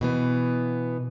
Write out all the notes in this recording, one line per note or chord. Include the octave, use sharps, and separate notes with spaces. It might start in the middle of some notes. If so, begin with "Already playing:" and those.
B2 E3 B3